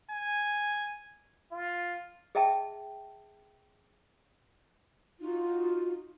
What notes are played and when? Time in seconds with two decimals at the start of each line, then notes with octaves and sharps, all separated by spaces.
0.11 G#5
1.51 F4
2.35 G#4 D#5 E5 G5 A5
5.20 D#4 F4 F#4